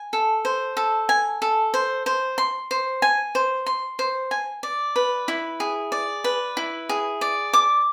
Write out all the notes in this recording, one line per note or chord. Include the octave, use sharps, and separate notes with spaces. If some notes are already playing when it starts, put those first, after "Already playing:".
Already playing: G#5
A4
C5
A4
G#5
A4
C5
C5
C6
C5
G#5
C5
C6
C5
G#5
D5
B4
E4
G#4
D5
B4
E4
G#4
D5
D6